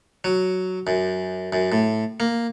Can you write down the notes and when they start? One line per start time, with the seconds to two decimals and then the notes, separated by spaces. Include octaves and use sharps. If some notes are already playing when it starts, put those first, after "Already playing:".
0.24 F#3
0.87 F#2
1.53 F#2
1.72 A2
2.20 A#3